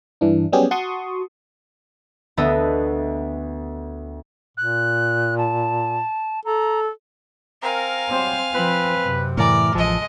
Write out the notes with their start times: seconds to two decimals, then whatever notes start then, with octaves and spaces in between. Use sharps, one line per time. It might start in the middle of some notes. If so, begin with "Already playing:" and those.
0.21 G2 E3 D4
0.52 F#3 G3 B3 C#4 G4 G#4
0.71 F#4 A5 C6 C#6 D#6
2.37 D2 B3 A4 D#5 E6
4.57 A#2 F#6
5.38 A5
6.45 A4 A#5
7.62 C4 A#4 F5 G#5
8.09 F#3 G3 C4 C5
8.53 F3 C4 B4
9.00 F#2 C3
9.37 A2 E3 A#4 D5
9.75 A1 F3 G#3 A4 D#5